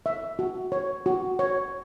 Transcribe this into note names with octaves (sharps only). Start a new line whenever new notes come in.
E5
F#4
C#5
F#4
C#5